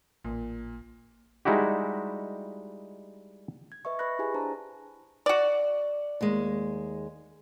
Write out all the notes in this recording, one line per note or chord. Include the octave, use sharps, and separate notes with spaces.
A1 A#2
G3 G#3 D#4 E4 F#4 G4
G#6
B4 D#5 E5 C#6
B4 D#5 B5 C#6 F#6 A#6
E4 G4 G#4 G#5
D4 C5 A5 A#5
F#4 D5
D#2 G#3